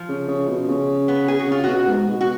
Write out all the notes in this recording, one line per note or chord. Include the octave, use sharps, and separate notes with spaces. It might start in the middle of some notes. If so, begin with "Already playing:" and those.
Already playing: F3
C#3
C#3
B2
C#3
B3
G#4
F#4
C#3 F4
B2 F#4
G#2
B2
F#4